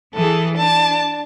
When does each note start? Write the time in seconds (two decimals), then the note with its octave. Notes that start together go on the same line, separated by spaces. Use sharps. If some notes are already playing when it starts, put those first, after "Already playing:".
0.16 E3 G#4 A4
0.58 D4 A5